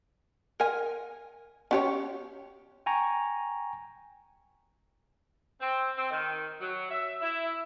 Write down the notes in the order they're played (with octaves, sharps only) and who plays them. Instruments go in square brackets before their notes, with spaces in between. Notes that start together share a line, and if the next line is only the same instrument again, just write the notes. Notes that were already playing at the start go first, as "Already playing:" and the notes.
[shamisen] A#4 G#5
C#4 G4 C#5
[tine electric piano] G5 G#5 A#5 C#6
[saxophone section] C4
C4
D#3
F#3
E5
E4